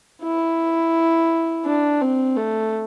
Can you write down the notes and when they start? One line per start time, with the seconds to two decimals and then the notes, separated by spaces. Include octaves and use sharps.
0.23 E4
1.66 D4
2.01 C4
2.37 A3